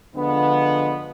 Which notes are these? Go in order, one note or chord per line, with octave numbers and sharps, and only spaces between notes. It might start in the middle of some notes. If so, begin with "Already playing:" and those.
D3 F3 G#3 B3